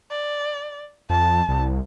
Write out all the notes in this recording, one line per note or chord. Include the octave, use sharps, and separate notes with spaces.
D5
F2 A5
C2